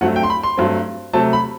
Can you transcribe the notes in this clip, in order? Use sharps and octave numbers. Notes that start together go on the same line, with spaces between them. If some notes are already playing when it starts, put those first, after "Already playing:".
G2 F#3 A3 C4 F#5
G5
C6
B5
C6
G2 F#3 A3 C4
C3 F#3 A3 C4 A5
B5